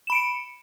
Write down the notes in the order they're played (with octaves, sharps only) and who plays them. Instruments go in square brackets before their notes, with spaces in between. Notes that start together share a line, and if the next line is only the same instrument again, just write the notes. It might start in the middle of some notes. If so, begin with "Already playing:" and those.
[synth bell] E7
B5
D7
C#7